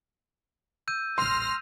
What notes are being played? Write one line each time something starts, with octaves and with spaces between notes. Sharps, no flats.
E6 G6 D#7
D#1 A1 C6 F6 A#6